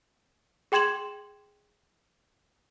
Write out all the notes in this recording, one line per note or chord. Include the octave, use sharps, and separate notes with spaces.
G#4 G5 C6 G#6 E7 F#7